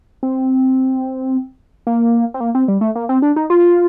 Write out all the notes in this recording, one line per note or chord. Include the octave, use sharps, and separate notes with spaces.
C4
A#3
C4
A#3
C4
G3
A3
A#3
C4
D4
D#4
F4